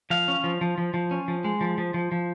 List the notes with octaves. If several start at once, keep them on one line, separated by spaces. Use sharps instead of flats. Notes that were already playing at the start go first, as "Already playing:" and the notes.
F3 F5
C#4
F3
F3
F3
F3
C#4
F3
G#3
F3
F3
F3
F3